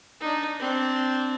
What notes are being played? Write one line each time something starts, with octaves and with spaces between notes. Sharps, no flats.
D4 D#4
C4 D4